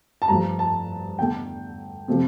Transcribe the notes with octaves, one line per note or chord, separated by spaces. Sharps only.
A5
G2 F3 A3 A#5
A5
E2 D3 A3 G5
C3 F3 A3